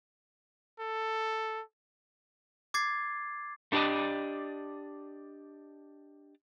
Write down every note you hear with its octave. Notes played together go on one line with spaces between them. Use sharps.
A4
D6 G#6 A6 C7
A3 D4 G4 G#4 D5 D#5